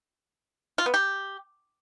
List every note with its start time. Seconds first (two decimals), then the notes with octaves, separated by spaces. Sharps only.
0.78 F4
0.86 B3
0.94 G4